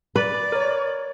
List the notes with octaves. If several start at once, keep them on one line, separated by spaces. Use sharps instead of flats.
B4 D5
A#4 C#5